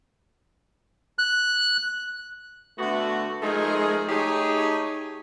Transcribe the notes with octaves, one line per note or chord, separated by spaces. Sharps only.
F#6
D3 A3 B3 F#4
F3 G#3 A3 D#4 G#4 A#4
A3 D#4 G4 G#4 C#5